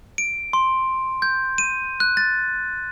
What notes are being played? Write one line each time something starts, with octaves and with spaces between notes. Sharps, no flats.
D7
C6
G6
D#7
F#6
A6